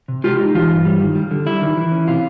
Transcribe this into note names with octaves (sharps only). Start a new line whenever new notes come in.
C3
G#3 F4 G4
D#4
E3 F4
G2
G3
D#3
G3
D3
G3 E4
D#3
E3
C#4
C3 F4